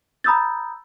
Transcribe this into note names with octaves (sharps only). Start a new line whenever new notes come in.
A#5 B5 D#6 E6 G6 A6